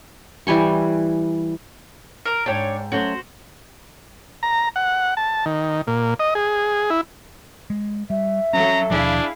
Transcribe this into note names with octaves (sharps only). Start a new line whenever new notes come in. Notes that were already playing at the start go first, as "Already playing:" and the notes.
E3 G3 G#5 C#6
A#4
G#2 D4 C#5 G5 A5
F#3 A3 C#4 F#4 C5
A#5
F#5
A5
D#3
A#2
D#5
G#4
E4
G#3
G3 E5
F#3 C#4 A4 A#5
D#2 B2 F3 D4 E4 G#4 F5